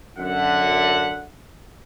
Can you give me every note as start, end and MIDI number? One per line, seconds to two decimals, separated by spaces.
0.18 1.27 42
0.18 1.27 50
0.18 1.27 76
0.18 1.27 78